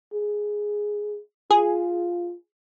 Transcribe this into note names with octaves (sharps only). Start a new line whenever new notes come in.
G#4
F4 G#4